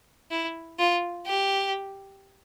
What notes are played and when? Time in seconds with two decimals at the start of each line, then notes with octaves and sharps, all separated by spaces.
0.31 E4
0.79 F4
1.27 G4